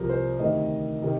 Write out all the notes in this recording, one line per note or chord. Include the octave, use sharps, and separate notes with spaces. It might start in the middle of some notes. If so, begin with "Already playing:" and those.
Already playing: C2 C3 F3 A#4
C5
D2 C3 D#3 D#5
C3 D#3